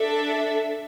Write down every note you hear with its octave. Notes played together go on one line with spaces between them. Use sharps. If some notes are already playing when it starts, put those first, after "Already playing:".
Already playing: D4 A4 E5